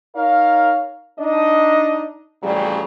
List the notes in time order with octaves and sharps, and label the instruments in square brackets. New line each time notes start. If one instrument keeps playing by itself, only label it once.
[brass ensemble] D#4 A#4 C#5 F5
D4 D#4 D#5
A1 F2 C#3 F#3 G3